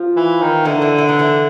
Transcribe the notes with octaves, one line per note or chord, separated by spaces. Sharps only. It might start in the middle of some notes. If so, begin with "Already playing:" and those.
Already playing: F3 F4
E3
D#3
D3 E3 E4
E3 E4
E4
D#4
E3 E4